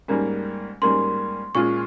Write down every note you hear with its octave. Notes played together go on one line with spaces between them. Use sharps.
G#2 G3 A#3 C#4
G#2 G3 A#3 C#4 C6
A#2 G#3 C#4 F4 G#4 C#6